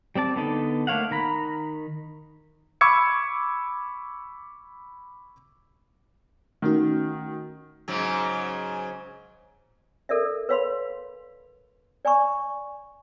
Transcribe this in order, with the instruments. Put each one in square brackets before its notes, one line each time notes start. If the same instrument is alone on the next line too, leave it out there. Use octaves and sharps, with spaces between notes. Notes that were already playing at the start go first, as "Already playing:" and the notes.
[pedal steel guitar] G3 C4 D5 A5
D3 B3 D#4 A4
A3 A#3 C#5 F5 F#5
D#3 A#5 B5
[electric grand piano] B5 C#6 D6 E6 G#6 C#7
[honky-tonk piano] D#3 [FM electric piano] A3 C#4 F#4
[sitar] G#2 C#3 F#3
[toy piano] A4 A#4 D5 E5
B4 C#5 F5 B5 C6
D5 G#5 A#5 C#6